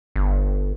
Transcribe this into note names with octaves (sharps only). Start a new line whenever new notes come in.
G1